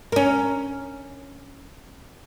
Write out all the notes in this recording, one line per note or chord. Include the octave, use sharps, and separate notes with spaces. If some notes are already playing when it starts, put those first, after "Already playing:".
C#4 A#4